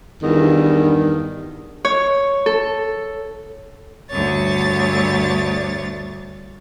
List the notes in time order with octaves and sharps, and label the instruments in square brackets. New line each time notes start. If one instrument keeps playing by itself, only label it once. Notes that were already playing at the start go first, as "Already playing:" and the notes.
[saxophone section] E2 G2 D#3
[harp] C#5
A4
[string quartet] D2 G2 C#5 A6